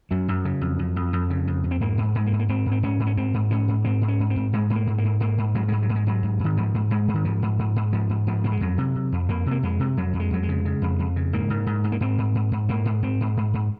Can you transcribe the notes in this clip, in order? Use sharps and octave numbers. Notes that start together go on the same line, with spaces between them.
F#2 F#3
F#2
C#3
F2
F2
F2
F2
C#3
F2
F2
C4
G#2 A#3
G#2
G#2 G#3
A#3
G#2
A#3
G#2 C4
G#2
C4
G#2 C#4
G#2
C#4
G#2 C4
G#2
G#2 C#4
G#2
G#2 C4
G#2
C#4
G#2
C4
G#2
G#2 G#3
G#2
A#3
G#2
A#3
G#2
G#2 A#3
G#2
G#2 F#3
G#2 G#3
F#3
G#2
G#3
G#2 F#3
G#2
G#2 D#3
G#2 F3
G#2
G#2 G#3
G#2
D#3
G#2 F3
G#2
G#2
G#2
G#2 F3
G#2
G#2 F3
G#2 A#3
G#3
F2 F#3
C3
C3
F2
F2 A#3
C3 A#3
F2 G#3
C3
F2 F#3
F2
G#3
F2 F#3
G#3
C#3
C#3
F2
F2
C#3
G#2 A#3
G#2
G#2
G#2
A#3
G#2 C4
G#2
G#2
G#2
G#2 A#3
G#2
G#2 C4
G#2
G#2
G#2